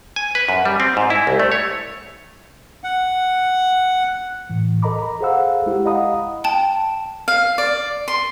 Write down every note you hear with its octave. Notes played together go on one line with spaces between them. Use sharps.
G#5
B4
F#2
G3
C4
G#2
E4
C2
A3
C#5
F#5
A2 E3
A4 A#4 D#5 A#5 B5 D6
A#5 B5
G#4 A4 C5 F5 F#5 E6
G#3 E4 G4
D#5 F5 F#5 A#5 B5 D#6
G5 A5 D7
F5
D5
C6